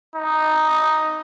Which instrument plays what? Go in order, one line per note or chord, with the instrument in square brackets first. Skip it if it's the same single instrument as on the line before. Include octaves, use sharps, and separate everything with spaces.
[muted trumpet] D#4